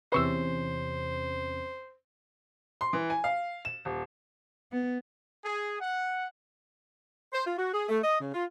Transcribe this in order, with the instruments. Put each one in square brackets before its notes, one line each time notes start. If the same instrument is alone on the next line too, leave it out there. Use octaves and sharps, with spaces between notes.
[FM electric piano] E2 C3 C#4 [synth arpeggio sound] B4 C#6 E6 [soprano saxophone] C5
[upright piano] C6
E3
G#5
F5
E7
D#1
[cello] B3
[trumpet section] G#4
F#5
[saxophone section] C5
F4
F#4
G#4
A3
D#5
C#3
F4